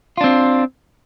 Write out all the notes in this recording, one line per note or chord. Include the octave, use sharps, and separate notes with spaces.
C4 D4 F4